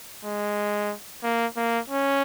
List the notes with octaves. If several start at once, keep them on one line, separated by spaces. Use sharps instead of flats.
G#3
A#3
A#3
C#4